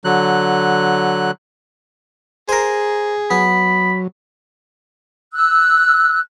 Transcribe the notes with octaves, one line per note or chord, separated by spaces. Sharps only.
D3 F#3 F#6
G#4 A#4 C5
F#3 B3 B5
E6 F#6